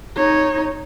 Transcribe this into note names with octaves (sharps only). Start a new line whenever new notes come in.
D#4 C#5